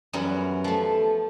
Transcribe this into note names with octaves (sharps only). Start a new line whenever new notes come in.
F#2 E3 G3 B3 A#4
F3 A3